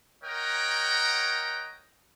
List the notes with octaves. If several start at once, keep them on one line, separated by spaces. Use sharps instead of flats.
A#4 C#5 D#5 F#5 G5 A#5